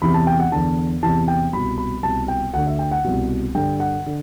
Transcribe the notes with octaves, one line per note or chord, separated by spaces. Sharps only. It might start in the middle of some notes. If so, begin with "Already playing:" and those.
E2 C3 E3 B5
A5
G5
F#5
E2 D3 A5
E2 C3 E3 A5
G5
C2 B2 B5
B5
C2 B2 A5
G5
D2 D3 F#5
E5
G5
F#5
C2 B2
G2 D3 G5
F#5
D3